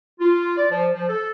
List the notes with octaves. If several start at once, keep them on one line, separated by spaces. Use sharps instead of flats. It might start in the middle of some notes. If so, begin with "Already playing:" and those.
F4
D5
F3
F3
A4